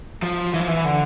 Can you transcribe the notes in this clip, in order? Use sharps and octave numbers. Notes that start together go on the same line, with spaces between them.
F3
E3
F3
E3
D3